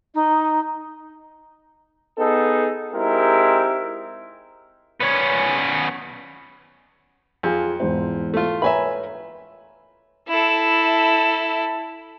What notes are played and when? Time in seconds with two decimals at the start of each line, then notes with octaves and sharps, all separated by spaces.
0.15 D#4
2.18 B3 D#4 G#4 A4
2.93 G#3 C4 D#4 E4 G4 A#4
5.00 B3 C#4
7.43 F2 F4 G#4 G#5
7.80 E2 G#2 C5
8.34 A3 F4
8.62 B4 C#5 E5 G#5 A#5 B5
10.28 E4 A4